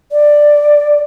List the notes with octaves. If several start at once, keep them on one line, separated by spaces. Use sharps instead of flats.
D5